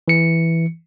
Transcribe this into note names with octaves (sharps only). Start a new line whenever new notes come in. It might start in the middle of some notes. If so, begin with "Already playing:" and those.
E3 C#7